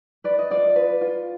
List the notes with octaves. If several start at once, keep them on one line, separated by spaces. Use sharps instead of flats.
B4 D5
D#5
F4 D5
B4
F4